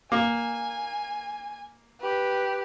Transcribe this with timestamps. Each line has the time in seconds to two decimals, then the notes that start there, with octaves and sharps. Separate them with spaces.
0.12 A#3 G#5
2.00 G4 B4